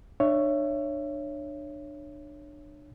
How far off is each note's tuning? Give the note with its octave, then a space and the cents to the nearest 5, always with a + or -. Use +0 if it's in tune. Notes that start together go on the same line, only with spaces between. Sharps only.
D4 +30 C#5 +0 E5 +25